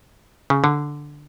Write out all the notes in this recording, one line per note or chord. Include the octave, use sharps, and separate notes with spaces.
C#3
D3